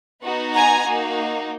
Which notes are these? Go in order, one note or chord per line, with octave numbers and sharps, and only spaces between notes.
B3 D#4 F#4
G#5 A#5
A#3 D#4 F#4